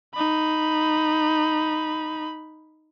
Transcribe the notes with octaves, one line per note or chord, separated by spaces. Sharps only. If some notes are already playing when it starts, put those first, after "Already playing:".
D#4 B5